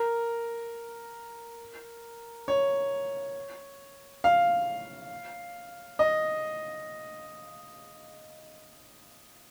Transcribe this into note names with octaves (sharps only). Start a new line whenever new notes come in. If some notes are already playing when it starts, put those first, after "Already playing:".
Already playing: A#4
C#5
F5
D#5